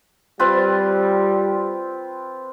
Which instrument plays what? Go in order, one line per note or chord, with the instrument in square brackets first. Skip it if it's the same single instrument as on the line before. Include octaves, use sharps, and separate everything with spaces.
[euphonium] G3 [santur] C4 F4 B4